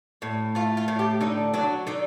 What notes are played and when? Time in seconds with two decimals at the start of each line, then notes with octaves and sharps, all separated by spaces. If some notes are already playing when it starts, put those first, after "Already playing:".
0.22 A2
0.55 A3 F4
0.77 F4
0.88 A2
0.99 G4
1.21 D3 D#4
1.54 F#3 D4
1.87 D3 D#4